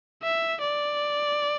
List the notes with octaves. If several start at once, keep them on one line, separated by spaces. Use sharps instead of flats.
E5
D5